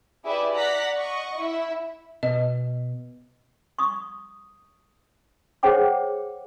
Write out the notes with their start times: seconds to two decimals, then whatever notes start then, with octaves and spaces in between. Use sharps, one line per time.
0.24 E4 G4 G#4 B4 D5 E5
0.53 D5 F#5 A#5 F#6 B6
0.95 D#5 F#5 C#6
1.37 E4 E5
2.23 B2 D#5
3.79 C#6 D#6
5.63 G#4 C5 C#5 F#5 G5 D6